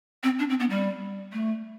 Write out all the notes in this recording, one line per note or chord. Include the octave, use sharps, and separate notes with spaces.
C4
D4
C4
B3
G3
A3